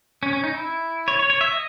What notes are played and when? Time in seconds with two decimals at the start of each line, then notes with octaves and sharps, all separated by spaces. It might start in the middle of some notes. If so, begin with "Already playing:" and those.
0.23 C#4
0.33 C#4
0.44 D#4
0.55 E4
1.08 C#5
1.19 C#5
1.30 C#5
1.41 E5
1.52 D#5